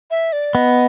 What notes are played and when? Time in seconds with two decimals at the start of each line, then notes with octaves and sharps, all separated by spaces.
0.11 E5
0.33 D5
0.55 B3 D#5